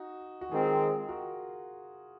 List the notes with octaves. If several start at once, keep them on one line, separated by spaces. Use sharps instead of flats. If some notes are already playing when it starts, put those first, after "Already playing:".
Already playing: D#4 F#4
F#4
D#3 G#3 C4 F4 G#4
F#4 A#4